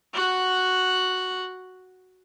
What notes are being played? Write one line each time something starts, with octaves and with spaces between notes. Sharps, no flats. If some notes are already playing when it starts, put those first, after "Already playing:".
F#4 F#5